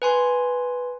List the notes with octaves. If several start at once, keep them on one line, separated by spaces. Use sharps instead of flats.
B4 G#5 C6